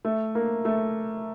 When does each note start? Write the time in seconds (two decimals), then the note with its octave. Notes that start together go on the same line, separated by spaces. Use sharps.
0.05 A3
0.35 A#3
0.65 A3